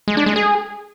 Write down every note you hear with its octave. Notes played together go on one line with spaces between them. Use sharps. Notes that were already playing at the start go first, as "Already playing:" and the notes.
G#3
D4
G#3
G#4